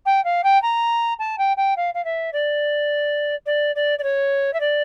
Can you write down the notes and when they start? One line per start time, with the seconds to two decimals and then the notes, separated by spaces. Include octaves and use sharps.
0.05 G5
0.24 F5
0.43 G5
0.62 A#5
1.19 A5
1.38 G5
1.56 G5
1.76 F5
1.94 F5
2.04 E5
2.32 D5
3.46 D5
3.75 D5
3.98 D5
4.03 C#5
4.53 E5
4.60 D5